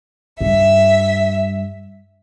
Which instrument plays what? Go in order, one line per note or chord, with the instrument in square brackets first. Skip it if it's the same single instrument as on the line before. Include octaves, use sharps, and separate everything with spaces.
[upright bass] G2 [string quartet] E5